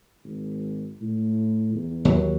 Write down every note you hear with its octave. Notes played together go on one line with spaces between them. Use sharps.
G#1
A2
E2
D#2 F#3